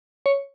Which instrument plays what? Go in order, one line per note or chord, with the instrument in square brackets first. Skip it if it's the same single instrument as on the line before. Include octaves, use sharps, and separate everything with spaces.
[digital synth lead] C#5